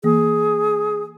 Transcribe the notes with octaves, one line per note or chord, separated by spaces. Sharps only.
E3 A#3 G#4